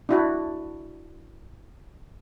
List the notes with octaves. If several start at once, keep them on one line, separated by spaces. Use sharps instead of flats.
D4 E4 F#4